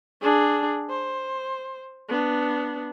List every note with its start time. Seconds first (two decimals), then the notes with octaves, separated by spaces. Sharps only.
0.21 D4 G#4
0.89 C5
2.09 B3 D4